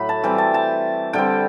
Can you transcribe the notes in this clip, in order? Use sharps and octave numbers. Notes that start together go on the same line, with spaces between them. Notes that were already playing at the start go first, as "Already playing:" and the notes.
Already playing: A2 F#3 A3 B5
A5
E3 G3 C4 G5
A5
A5
D3 G3 C4 G5